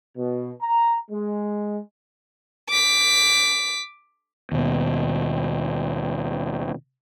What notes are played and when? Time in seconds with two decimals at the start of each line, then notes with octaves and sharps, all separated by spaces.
0.17 B2
0.61 A#5
1.11 G#3
2.70 D6 B6
4.52 D#2 B2